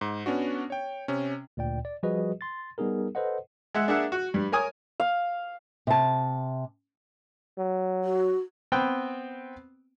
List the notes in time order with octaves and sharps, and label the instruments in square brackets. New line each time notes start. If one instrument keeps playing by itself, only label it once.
[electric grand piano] G#2
B3 C#4 D4 F#4
C#5 G5
C3 C#4
[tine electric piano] D2 A#2 D5 G5
D5
F3 G3 F#4 G#4 B4 D#5
C6 A6
G3 B3 D#4 G#4 A#4
A4 B4 C5 D#5 F#5
[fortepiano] G#3 E5 F#5
A#3 D4 G#4 E5 F#5
F#4
G2 G3
A#4 C#5 G#5 D#6
[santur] F5
[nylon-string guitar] C3 A5
[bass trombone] F#3
[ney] F#4
[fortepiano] B3 C4 G5